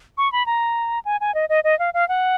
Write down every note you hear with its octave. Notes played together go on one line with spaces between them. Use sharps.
C#6
B5
A#5
G#5
G#5
D#5
D#5
D#5
F5
F5
F#5